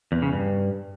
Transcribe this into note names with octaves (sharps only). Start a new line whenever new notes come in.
E2
C#3
G2